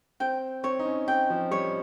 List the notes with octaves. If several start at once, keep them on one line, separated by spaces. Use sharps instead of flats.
C4 G5
C4 C#5
D#4
C#4
C4 G5
F3
G3 C#5